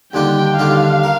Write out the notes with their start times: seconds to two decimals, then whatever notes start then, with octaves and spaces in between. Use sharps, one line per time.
0.13 D#2 D3 G3 D4 F4 G5
0.58 D#2 D3 G3 D4 F4 F5
1.03 A#4